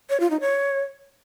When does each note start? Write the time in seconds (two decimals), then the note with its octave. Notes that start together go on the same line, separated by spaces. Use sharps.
0.10 C#5
0.20 F4
0.30 D#4
0.41 C#5